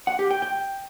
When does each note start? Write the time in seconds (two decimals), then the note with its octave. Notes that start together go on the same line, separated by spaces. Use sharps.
0.07 F#5
0.19 G4
0.31 G5
0.42 G5